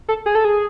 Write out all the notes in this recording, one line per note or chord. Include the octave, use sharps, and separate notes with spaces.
A4
G#4
A4
G#4